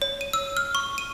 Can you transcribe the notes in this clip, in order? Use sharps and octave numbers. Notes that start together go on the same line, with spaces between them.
C#5
D#7
E6
F6
C#6
D#7